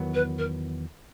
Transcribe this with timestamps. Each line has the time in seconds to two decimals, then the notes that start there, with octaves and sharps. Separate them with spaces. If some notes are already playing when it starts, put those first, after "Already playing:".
Already playing: E2 D#3 F#3 B3
0.14 B4
0.38 A#4